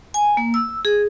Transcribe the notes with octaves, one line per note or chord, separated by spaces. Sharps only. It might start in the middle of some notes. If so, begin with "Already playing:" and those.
G#5
A#3
E6
G#4